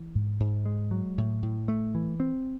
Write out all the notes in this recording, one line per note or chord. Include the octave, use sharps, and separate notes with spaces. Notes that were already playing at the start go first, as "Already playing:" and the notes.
Already playing: E3
G#2
G#2
G#3
F#3
A2
A2
A3
E3
C4